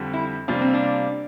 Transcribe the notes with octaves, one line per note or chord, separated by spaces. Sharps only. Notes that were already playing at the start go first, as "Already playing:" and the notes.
Already playing: F2 D3 G3
E4
C3 G3 A#3 D4 F4
C4
D4